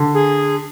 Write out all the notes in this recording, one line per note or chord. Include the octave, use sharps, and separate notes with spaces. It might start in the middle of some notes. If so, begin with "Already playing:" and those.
Already playing: D3
G#4